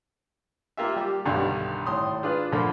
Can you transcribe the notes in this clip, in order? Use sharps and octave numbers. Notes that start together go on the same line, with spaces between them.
A#3 F4 G4 E5
G3 G4 D6
B1 G2 D3 D#3 A4 D5
G#1 A2 C6 D#6
D4 F4 G#4 B4
A#2 D3 F3 A3 A#3 B5